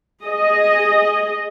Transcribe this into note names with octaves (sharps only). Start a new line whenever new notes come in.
G#4 D#5